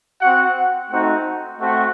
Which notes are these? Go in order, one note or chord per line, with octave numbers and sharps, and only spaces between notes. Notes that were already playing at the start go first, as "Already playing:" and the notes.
C4 F#4 F#5
A3 C4 D#4 F#4 F#5
A3 C4 F#4